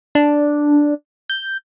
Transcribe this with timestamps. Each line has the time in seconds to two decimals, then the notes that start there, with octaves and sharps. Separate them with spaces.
0.15 D4
1.30 G6